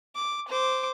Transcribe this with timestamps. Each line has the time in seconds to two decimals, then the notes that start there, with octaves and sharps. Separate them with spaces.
0.16 D6
0.48 C5 D6